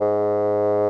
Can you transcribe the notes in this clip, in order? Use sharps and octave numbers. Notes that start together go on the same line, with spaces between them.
G#2